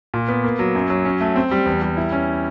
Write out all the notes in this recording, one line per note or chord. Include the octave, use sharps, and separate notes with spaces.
A#2
B3
A#3
F#3
F#2
F#3
C#4
A3
C4
G3
E2
G3
E4
C#4